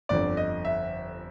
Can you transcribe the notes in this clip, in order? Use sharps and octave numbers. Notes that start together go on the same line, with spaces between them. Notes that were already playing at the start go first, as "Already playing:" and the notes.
G1 F2 D3 D5
D#5
E5